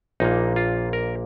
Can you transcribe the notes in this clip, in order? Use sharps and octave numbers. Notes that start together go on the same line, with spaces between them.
A#1 A#2 A#3 D#4
F4
A#4